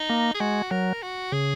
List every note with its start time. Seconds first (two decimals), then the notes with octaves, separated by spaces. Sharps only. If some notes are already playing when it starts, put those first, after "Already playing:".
Already playing: D#4
0.10 A#3
0.34 G#4
0.40 G#3 F#4
0.71 F#3 A#4
1.02 F#4
1.32 C#3 G#4